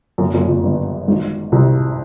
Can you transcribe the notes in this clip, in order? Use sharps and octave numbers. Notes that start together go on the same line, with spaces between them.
F#1 F#2
F#1 F#2
F2
F#1 F#2
G1 G2
G#1 G#2
C2 C3